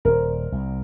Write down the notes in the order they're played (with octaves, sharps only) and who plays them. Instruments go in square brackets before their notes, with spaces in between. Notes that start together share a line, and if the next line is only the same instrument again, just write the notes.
[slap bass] D#1 [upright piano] A#4 C5
[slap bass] C2